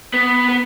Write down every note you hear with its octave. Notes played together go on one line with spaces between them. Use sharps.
B3
B3